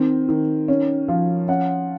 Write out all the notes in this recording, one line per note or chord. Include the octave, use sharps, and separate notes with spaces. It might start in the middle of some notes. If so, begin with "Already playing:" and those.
Already playing: D#3 C4
D#3
C#4
F3
C#4 F#5